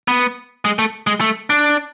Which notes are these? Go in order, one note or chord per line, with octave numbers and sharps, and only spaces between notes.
B3
G#3
A3
G#3
A3
D4